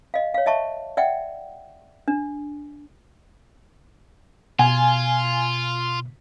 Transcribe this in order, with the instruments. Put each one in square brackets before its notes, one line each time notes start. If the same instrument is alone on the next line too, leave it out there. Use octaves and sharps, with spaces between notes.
[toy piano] D#5 F5
C#5 F5
D#5 E5 A5 C#6
D5 E5 F#5 G5
D4
[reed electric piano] B2 [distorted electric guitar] F4 [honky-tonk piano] G#5